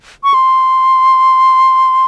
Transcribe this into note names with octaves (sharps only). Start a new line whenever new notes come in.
C#6
C6